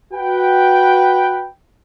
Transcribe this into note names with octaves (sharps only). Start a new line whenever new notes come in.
F#4 B4 G5